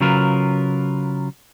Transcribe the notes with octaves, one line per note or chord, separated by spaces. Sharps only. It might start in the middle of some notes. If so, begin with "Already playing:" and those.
C#3 F#3 F4 A#4 B4